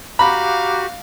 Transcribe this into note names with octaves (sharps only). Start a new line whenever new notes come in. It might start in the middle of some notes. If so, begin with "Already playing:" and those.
F#4 G4 F5 A#5 B5